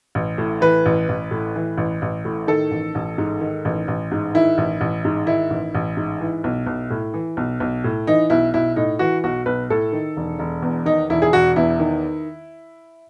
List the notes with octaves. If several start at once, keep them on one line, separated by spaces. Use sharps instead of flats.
A1
A2
E3 B4
A1
A1
A2
E3
A1
A1
A2
D#3 A4
A1
A1
G#2
D#3
A1
A1
G#2
D#3 E4
A1
A1
G#2
D#3 E4
A1
A1
G#2
E3
B1
B1
A2
E3
B1
B1
A2
E3 D#4
B1 E4
B1 E4
A2 D#4
E3 F#4
B1 F#4
B1 B4
A2 A4
D#3
E1
E1
E2
D#3 D#4
E1 E4
G#4
E1 F#4
E2 E4
D#3